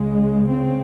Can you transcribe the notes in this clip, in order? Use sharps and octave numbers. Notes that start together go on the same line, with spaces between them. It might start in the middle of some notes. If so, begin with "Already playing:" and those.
Already playing: C#2 C#3 G#3
C4